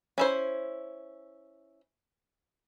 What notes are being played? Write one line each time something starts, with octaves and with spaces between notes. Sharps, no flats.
C#4 E4 C5